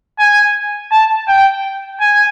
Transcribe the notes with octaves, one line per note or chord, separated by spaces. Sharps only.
G#5
A5
G5
G#5